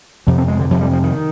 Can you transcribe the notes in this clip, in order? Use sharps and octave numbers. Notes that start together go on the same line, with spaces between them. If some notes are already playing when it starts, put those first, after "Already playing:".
F2 C3 F3
C4
G#3
D3
F2 C3 F3
G3
F3
D#3